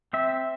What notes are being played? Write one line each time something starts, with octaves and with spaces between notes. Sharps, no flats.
C4 E5